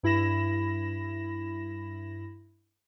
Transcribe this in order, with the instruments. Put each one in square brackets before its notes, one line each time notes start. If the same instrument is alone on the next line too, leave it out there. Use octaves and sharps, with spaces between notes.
[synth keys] G2 E4 B5 A#6 E7